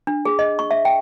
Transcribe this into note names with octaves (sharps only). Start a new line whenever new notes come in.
D4
G#4
D#5
C#6
E5
G5